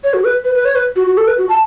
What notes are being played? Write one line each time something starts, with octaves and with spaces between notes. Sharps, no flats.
C#5
F#4
B4
B4
B4
C#5
B4
F#4
F#4
A4
B4
F#4
A5